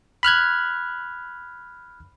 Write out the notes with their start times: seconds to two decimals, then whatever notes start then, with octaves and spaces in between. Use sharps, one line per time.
0.23 B5 F6 F#6 G#6